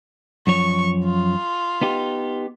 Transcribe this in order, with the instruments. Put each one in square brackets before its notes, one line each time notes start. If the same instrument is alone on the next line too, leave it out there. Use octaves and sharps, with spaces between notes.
[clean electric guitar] F#2 F3 C#5 [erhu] C#6
[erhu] F4
[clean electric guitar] B3 D#4 G4